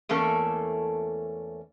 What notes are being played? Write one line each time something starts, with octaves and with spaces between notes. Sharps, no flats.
E2 A3 A#3 C#4 A4